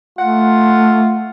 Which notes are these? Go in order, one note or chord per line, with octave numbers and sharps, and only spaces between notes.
A3 F4 F#5